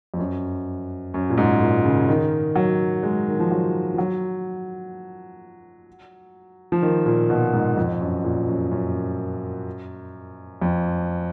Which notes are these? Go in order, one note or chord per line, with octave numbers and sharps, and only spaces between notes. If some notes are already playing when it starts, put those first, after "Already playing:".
F2
F#2
F#2
A#2
G#2
A#2
C#3
D#3
F#3
G#3
D#3
F3
F#3
F3
F#3
F3
D#3
A#2
B2
G#2
F2
F#2
A#2
F#2
F#2
F2